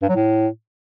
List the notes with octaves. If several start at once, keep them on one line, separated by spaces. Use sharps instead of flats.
G2
F#3
A2